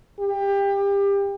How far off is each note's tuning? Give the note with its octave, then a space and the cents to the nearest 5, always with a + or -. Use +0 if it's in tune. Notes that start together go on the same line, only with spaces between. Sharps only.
G4 +25